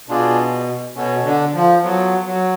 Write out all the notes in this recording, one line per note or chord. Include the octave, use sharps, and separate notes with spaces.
B2 D4 F4 G#4 D5
B2 C#4 F#4 A4 C#5
D3
F3
F#3 B3 F4 A4
F#3